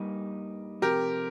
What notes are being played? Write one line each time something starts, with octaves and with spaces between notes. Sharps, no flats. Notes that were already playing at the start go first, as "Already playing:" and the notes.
Already playing: G2 G3 A#3 D#4
F2 C3 G4 A#4